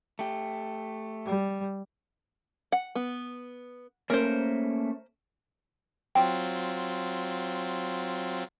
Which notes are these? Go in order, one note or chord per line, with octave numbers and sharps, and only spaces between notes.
A3 G4
G3
F#5
B3
A3 A#3 C#4 A#4 C5
F#3 C4 F4 G5